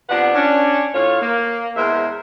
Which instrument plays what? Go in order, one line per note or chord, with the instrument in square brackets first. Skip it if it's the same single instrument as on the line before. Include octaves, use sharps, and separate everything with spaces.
[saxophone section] C3 F3 B3 D4 B4 F#5
C#4 D4
A2 F4 C#5
A#3
E2 G#3 A#4 C5 E5